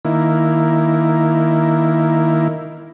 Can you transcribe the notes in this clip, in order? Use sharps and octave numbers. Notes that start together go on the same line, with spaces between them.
D#3 A#3 E4